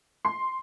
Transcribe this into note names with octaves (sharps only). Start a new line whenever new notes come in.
C6